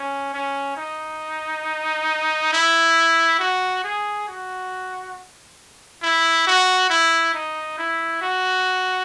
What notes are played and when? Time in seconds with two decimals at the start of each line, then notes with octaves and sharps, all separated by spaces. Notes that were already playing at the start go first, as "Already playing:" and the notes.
Already playing: C#4
0.34 C#4
0.77 D#4
2.53 E4
3.39 F#4
3.84 G#4
4.28 F#4
6.02 E4
6.47 F#4
6.90 E4
7.34 D#4
7.78 E4
8.22 F#4